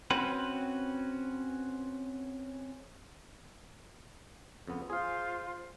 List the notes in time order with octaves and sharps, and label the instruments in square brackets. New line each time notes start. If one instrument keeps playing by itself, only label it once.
[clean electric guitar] C4 C#4 F#4 B4
[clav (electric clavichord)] F2 C#3 B3
[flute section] F4 C5 C6 [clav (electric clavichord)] G#4 F5